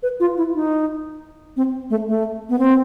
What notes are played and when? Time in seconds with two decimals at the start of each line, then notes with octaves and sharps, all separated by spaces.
0.03 B4
0.20 F4
0.37 E4
0.54 D#4
1.56 C4
1.90 A3
2.08 A3
2.49 B3
2.59 C4